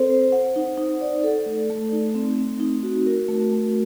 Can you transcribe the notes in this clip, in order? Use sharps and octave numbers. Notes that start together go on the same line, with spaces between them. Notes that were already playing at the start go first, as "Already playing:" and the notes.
Already playing: C4 A4 C5
C5
F#5
D#4
D#4
D5
A4
A3
A3
D#4
C4
C4
D#4
F#4
A#4
A3
A3